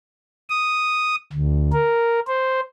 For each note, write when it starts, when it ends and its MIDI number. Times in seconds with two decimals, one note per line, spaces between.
0.50 1.16 87
1.33 1.72 38
1.73 2.20 70
2.28 2.60 72